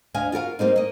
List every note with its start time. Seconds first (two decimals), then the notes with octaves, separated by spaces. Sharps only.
0.14 D2 D#5 F5 G#5
0.32 F4 F#4 A#4 F5
0.59 G3 A#3 C4 D#4
0.76 A#3 D#5